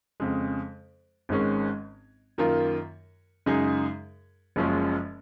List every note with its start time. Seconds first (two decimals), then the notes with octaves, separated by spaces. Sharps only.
0.20 F2 C#3 G#3
1.29 G#1 G#2 D#3 G#3 C#4
2.38 F#2 D#3 A#3 F4 A#4
3.46 F#2 C#3 G#3 D#4 G#4
4.56 F#1 F#2 F3 G#3 C#4